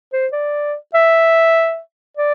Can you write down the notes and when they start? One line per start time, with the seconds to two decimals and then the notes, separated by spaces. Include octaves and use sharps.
0.13 C5
0.33 D5
0.94 E5
2.17 D5